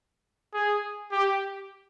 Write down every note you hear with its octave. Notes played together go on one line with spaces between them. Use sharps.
G#4
G4